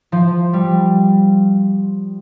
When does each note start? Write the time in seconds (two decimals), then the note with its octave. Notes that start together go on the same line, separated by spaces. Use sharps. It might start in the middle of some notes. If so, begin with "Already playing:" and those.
0.12 F3
0.53 G3